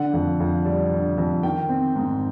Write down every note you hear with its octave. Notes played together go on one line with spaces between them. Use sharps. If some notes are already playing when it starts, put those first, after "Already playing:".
Already playing: D3 F#5
F2
F2
G3
D3
F2
D#3 G5
C4
G#2